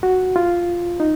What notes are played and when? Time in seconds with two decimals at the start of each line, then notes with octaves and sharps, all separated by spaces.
0.03 F#4
0.36 F4
1.00 D#4